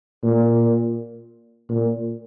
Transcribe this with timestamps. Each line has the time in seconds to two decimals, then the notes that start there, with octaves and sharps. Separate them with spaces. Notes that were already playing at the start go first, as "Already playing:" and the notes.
0.23 A#2
1.70 A#2